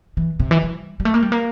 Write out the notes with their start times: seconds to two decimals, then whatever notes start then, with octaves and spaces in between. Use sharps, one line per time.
0.17 E3
0.40 C3
0.51 E3
0.63 G3
1.00 G3
1.05 A3
1.14 A#3
1.22 G3
1.32 A#3